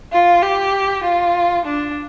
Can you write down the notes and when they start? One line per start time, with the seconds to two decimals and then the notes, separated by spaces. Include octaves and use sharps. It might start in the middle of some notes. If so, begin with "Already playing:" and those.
0.13 F4
0.43 G4
1.04 F4
1.65 D4